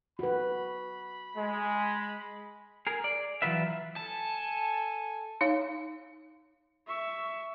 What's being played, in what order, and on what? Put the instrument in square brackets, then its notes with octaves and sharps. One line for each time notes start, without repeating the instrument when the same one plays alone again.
[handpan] F#4 B4 [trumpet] B5
[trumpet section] G#3
[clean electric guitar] G#4 A#4
D5
E3 F#3 F4 B4 E5
[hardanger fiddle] A4 G#5 [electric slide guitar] A5
[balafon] D#4 C#5 F5
[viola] E5 C#6